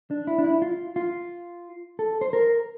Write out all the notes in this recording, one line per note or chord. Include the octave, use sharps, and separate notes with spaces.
D4
E4
D4
E4
F4
F4
A4
C5
A#4